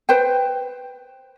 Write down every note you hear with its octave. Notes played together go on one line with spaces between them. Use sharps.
B4 C5 G5